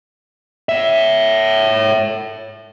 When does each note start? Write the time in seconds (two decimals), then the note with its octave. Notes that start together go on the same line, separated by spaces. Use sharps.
0.69 C#5 E5